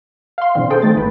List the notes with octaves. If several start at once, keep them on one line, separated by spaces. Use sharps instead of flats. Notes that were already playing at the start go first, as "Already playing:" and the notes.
F5 C6
B2 D3 E3 C4
G#4 A4 C5 G5
D#3 A3 A6
G#1 B4